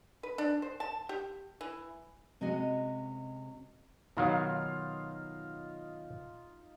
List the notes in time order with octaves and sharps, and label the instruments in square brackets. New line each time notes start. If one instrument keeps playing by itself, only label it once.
[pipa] B4
D4
C5
A5
G4
E3
[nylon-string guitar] C3 G#3 C#4 F#4 D#5 G#5
[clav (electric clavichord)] B2 D#3 F#3 [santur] D#4 F4 F5